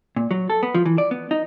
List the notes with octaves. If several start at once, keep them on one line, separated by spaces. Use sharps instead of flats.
A#2
F#3
A4
B3
F3
E3
D5
B3
D#4